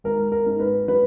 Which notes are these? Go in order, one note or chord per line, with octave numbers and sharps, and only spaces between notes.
G#1 A#4
A#4
G#2
B4
F#3 B4